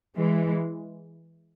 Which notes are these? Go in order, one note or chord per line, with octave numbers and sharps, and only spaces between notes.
E3 G#3